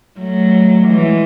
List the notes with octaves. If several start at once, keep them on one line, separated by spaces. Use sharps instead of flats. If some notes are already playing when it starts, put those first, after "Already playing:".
F#3 A3
E3 G#3